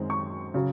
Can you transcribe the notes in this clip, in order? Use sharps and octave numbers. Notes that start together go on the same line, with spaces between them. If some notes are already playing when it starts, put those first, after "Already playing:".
Already playing: F#2 D#3 G#3 C4
C#6
C#3 F#3